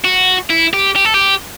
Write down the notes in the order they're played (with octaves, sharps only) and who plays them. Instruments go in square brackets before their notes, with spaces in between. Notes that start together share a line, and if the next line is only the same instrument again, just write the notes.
[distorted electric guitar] F#4
E4
G4
G4
A4
G4